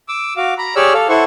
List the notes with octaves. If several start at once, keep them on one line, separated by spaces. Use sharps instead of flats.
D6 E6
F#4 F5 D6
A#5 B5
G4 G#4 C#5 D5 E6 F6
A4 F5
E4 A4 C5 F#5 C#6